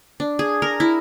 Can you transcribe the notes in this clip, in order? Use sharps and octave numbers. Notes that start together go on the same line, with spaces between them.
D4
G#4
A#4
E4